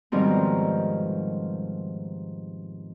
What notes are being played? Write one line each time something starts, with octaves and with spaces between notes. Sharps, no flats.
G#2 B2 D#3 F3 G3 C4